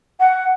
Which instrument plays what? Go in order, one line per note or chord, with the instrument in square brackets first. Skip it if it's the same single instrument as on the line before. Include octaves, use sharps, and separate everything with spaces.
[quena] F#5